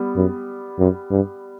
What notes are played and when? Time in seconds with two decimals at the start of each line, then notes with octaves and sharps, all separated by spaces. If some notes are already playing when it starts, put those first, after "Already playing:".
Already playing: G3 B3
0.16 F#2
0.79 F#2
1.11 G2